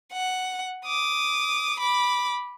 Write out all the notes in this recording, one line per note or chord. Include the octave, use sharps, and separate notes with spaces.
F#5
D6 D#6
B5 D6